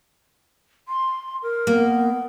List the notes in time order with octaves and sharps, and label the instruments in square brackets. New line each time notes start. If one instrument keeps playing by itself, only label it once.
[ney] C6
A#4
[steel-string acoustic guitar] A#3 [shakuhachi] B3